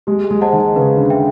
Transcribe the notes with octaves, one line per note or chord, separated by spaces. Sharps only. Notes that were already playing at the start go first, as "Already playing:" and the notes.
G#3 G4
G#3
C5 D#5 F#5 A5
D#3
C#3 B4
D3
E5 G5